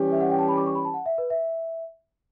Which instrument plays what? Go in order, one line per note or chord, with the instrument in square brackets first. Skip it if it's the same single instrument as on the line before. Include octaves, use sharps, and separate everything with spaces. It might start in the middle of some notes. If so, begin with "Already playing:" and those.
Already playing: [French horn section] E3 G3 C#4 G4
[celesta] E5
F#5
G5
A5
B5
D6
C#6
B5
A5
F#5
E5
B4
E5